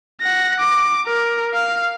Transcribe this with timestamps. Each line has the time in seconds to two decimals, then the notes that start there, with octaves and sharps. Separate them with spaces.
0.21 F#5 A#6
0.60 D6
1.07 A#4
1.54 F5